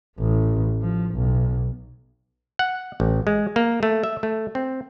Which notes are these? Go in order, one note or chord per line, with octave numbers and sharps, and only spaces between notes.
A1
F3
B1
F#5
A1
G#3
A#3
A3
E5
A3
C4